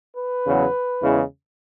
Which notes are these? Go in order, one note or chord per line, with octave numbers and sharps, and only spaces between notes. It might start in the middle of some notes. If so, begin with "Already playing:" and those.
B4
E2 C#3 F#3
E2 C#3 E3 G#3